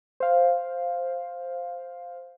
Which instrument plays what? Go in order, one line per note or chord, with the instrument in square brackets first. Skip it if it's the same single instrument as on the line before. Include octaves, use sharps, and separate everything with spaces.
[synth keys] C5 F5